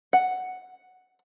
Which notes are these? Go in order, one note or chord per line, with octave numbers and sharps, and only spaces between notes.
F#5